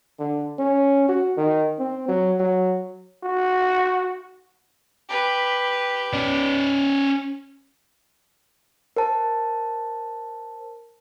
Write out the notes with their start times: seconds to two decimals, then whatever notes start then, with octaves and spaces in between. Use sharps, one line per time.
0.19 D3
0.59 C#4
1.09 F#4
1.37 D#3
1.79 C4
2.08 F#3
2.40 F#3
3.24 F#4
5.08 G4 B4
6.13 C#4 D5
8.96 A#4 C5 A5